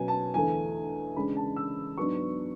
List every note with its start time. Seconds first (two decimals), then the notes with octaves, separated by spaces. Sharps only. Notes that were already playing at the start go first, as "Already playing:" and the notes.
Already playing: B2 F#3 C#4 G#5
0.08 A5
0.34 E2 D3 A3 G#5
1.16 C#3 G#3 D4 B5
1.37 A5
1.56 E6
1.97 G#2 F#3 B3 D4 C#6